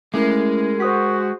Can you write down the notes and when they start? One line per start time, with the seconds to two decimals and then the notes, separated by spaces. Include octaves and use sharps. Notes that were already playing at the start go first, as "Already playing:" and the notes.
0.14 G#3 A3 C#4 E4 A#4
0.80 F#4 C5 D#6 B6